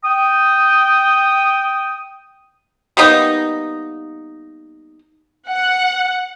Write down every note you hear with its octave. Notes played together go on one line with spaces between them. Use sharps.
G5 D#6
G3 A#3 B3 D#4
F#5